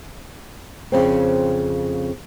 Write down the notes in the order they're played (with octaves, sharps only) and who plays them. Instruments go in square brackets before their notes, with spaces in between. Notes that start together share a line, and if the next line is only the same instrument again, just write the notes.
[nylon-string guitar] F2 C#3 C4